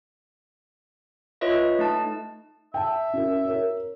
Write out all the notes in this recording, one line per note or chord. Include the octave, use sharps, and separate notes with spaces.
F4 B4 C#5 D#5 E5
A3 D#4 A5
E5 G5 A5
C#4 F#4 A#4
A#4 C#5